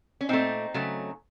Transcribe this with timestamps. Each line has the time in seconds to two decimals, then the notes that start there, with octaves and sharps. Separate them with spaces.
0.21 C#4
0.29 A#2 A3 C4 D#4
0.74 C#3 F#3 A3